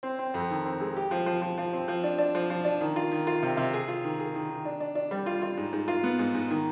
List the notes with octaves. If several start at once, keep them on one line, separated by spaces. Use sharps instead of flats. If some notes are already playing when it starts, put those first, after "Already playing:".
C4
C4
F2
D#3
C4
G#3
G4
F3
F3
F3
F3
C4
F3
D4
D4
F3
F3
D4
D#3
F4
D#3
F4
C3
C3
G#4
F4
D#3
G#4
D#3
D#3
D4
D4
D4
G3
F4
F4
G#2
G#2
F4
B3
G#2
G#2
D#3